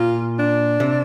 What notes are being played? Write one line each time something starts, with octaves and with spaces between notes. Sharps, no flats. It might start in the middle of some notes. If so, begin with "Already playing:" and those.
Already playing: A#2 F4
D4
C3